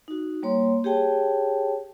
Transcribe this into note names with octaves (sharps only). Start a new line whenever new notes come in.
D#4 F#4
G3 A#3 C#5 C6
G4 G#4 C#5 G5 A5